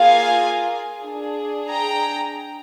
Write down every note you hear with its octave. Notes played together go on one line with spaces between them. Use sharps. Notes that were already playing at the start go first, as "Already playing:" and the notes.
Already playing: A#3 F4 G#4 F5 G#5
D4 G#4
G5 A#5